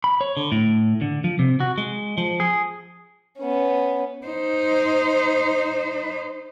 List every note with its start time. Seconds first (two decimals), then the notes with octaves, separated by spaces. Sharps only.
0.04 B5
0.21 C#5
0.37 D3
0.52 A2
1.01 D3
1.24 F3
1.39 C3
1.60 F#4
1.78 G#3
2.18 F3
2.40 G#4
3.39 B3 C#4
4.27 D#4 C5